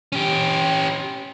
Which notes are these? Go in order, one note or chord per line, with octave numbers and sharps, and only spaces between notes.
C#4 G4